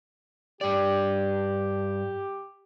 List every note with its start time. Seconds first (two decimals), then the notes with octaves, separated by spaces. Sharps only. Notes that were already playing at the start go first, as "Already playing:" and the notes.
0.61 G2 G4 D5